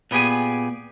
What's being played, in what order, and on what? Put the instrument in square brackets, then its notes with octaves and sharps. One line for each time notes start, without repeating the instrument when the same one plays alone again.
[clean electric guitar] A#2 B3 G4 G#4 G#5